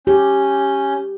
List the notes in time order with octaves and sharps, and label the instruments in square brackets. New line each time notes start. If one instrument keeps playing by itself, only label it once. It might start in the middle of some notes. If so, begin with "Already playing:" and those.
[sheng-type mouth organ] C#4 G6 [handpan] G4